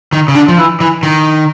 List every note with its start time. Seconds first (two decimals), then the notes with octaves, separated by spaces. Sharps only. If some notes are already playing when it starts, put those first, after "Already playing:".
0.13 D#3
0.28 C#3
0.35 D3
0.48 F3
0.58 E3
0.80 E3
1.03 D#3